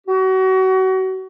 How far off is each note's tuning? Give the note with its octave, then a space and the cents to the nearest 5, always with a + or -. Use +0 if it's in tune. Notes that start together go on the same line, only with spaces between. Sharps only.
F#4 +30